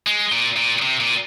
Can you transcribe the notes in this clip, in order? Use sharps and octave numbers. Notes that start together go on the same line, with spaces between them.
G#3
A#2
A#2
C3
A#2